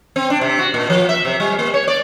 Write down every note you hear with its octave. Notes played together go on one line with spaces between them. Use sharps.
C4
D4
C3
F#4
A#2
F3
E5
C3
G3
A#3
C#5
D5